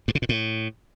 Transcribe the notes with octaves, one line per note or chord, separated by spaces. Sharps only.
G2
C#3
A#2
A2